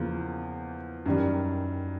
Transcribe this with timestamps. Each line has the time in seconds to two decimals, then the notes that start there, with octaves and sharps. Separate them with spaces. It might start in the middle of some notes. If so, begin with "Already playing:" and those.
Already playing: E2 C#3 F3 A#3
1.06 F#2 D#3 G3